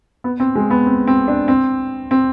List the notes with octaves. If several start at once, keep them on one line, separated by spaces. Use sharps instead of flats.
B3
C4
G#3
B3
C4
C4
D4
C4
C4